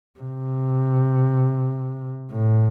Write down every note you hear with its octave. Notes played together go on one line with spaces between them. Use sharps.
C3
A2